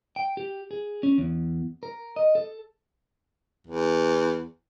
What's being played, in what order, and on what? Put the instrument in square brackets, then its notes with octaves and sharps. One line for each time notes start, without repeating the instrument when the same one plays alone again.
[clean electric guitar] G5
G4
G#4
C#4
E2
A#4
D#5
A4
[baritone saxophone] E2